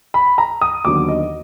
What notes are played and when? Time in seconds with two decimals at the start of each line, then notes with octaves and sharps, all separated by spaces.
0.14 B5
0.38 A#5
0.61 D#6
0.85 D#2 D3 F#3 B3 D6
1.08 D#5